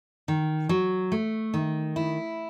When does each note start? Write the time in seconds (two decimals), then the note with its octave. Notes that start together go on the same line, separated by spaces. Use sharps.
0.28 D#3
0.69 F#3
1.12 A3
1.54 D#3
1.96 E4